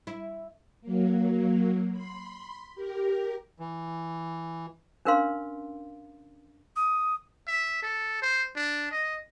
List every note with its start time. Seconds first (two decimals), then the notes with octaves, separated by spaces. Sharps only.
0.07 E4
0.81 F#3 A#3
1.92 B5 C6
2.75 G4 A#4
3.60 E3
5.05 C#4 D4 A#4 B4 F5 C6
6.76 D#6
7.48 E5
7.83 A4
8.22 C5
8.56 D4
8.91 D#5